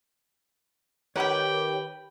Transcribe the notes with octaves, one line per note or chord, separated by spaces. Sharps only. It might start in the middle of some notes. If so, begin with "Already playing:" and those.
D#3 G4 B4 C#5 G5 B5